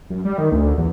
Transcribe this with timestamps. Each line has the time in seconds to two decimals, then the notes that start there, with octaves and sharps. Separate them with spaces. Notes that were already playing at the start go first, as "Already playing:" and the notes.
0.10 F#2
0.25 G3
0.38 D#3
0.52 D2
0.78 E2